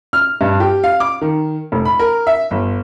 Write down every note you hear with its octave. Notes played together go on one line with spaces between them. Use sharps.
F6
G2
G4
F5
D6
D#3
F1
B5
A#4
E5
G1